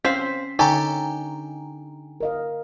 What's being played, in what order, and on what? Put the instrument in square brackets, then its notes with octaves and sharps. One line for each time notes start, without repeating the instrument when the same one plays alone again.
[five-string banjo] C4 C5 F5 [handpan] C#4 [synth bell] B6 C7
[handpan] D3 D#4 [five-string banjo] G4 A4 C#5 [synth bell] G5 G#5 A#5
[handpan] A#4 D#5 F5